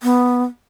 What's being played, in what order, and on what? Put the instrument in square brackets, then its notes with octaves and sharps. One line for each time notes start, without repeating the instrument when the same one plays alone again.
[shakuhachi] B3